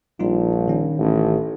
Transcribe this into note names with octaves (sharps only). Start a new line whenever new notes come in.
A#1 G3 D#4 F4
D#3 C#4
A1